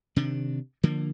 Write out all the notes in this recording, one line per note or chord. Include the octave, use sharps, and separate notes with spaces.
C3 D#3 D4
D3 F3 A#3